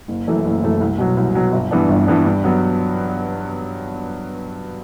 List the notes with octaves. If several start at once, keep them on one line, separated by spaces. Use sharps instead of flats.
F#1
F#2 E3 A3
F#1
F#2 E3 A3
C2
B2 F#3
C2
B2 F#3
G1
G2 E3 B3 D4
G1
G2 E3 B3 D4
G2
F#3 B3